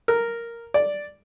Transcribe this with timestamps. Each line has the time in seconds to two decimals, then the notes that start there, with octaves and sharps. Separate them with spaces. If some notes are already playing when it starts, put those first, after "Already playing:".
0.08 A#4
0.74 D5